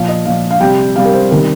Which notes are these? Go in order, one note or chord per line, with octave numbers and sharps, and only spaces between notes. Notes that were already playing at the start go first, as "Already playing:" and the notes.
Already playing: A#2 F3 F5
D#5
A#2 F3 F5
F5
C3 G3 G5
C3 G3 F5
A#4
C5
C3 D#3 G3 A#4